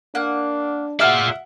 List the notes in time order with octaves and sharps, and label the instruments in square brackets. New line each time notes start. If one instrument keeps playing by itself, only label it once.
[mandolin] A#3 F#5 [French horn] D4
[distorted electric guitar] F4 D5 [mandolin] G#4 E6 F6 [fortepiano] E5 F#5